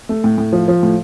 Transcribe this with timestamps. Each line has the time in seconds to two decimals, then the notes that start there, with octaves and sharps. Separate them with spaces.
0.09 A3
0.24 A2
0.38 A2
0.53 F3
0.68 F3
0.83 A2